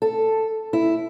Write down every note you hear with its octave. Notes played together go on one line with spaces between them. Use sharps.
A4
E4